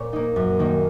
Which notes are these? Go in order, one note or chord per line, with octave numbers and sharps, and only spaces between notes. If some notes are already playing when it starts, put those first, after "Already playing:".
Already playing: A#2 C#5
A#3 D#4
F#2
D#3 A#3 D#4